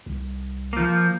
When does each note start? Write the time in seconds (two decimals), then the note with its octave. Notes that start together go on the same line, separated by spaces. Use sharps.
0.06 C2
0.73 F3 A#3